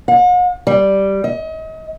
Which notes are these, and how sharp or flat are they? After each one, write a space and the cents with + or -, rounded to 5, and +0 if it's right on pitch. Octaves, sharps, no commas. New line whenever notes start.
F#5 -45
G3 -5
D#5 +35